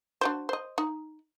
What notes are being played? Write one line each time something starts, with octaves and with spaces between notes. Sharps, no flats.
D4 F#4 C5
C5 D#5
D#4